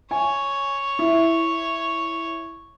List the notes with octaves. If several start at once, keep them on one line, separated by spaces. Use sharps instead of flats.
C#5 G#5
E4